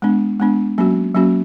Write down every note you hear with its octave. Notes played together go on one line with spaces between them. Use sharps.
G#3 B3 D4
G#3 B3 D4
F#3 A#3 C#4 F#4
F#3 A#3 C#4 F#4